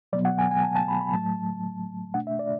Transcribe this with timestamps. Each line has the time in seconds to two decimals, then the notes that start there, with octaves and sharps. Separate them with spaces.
0.13 B2 F#3 B3 D5
0.25 F#5
0.38 G#5
0.51 G#5
0.63 A5
0.76 A5
0.88 B5
1.01 B5
1.13 A2 F#3 A3 A5
2.14 B2 A3 D4 F#5
2.27 E5
2.39 D5